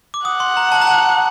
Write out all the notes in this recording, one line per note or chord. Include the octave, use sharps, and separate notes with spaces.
D6
F#5 D#6
C6
A#5
A5
A#5
A5